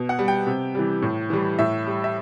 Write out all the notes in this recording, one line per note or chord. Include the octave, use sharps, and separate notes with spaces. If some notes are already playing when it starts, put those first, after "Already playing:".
Already playing: B2
F#5
G3
G5
C3
E3 G3
A2
E3 G3
A2 E5
G3
E5